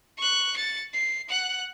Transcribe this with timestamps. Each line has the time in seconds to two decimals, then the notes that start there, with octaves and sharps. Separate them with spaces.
0.17 C#6 F#6
0.57 A6 C#7
0.93 C7
1.29 F#5 F#6